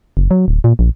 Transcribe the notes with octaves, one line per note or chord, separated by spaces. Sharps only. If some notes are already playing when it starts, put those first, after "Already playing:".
F#1
F#3
D1
A#2
A#1